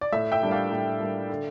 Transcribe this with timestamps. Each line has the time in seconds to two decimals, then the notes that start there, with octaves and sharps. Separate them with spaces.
0.01 D5
0.12 A2 E5
0.32 E5 G5
0.42 G3 A#3 D4
0.51 D5 F5
0.72 A2
1.00 G3 A#3 D4
1.30 D3